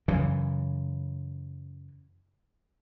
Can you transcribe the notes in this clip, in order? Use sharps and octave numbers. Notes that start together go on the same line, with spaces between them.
F#2 C#3 E3